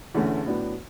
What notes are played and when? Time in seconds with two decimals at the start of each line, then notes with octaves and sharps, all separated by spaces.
0.15 E2 D3 A3 C#4
0.46 A2 F#3 B3 D4